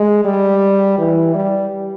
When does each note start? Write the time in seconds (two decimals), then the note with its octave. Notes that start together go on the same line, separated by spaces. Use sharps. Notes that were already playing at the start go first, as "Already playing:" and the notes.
Already playing: G#3
0.25 G3
0.98 E3
1.35 G3